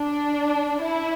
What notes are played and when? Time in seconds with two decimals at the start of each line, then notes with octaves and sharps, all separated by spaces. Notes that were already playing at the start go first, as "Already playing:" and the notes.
Already playing: D4
0.82 E4